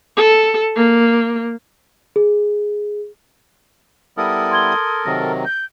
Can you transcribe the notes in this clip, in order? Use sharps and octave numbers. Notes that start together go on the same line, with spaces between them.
A4
A#3
G#4
G3 B3 E4 A4 A#4 D#6
C6 G#6 G7
C3 D#3 F#3 A#6
G6